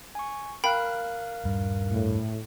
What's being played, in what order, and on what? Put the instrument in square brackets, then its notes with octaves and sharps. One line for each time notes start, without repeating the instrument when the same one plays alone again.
[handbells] G#5 C#6
[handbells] A#4 F5 F#6 [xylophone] G5 B5
[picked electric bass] D#1 G2
[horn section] A2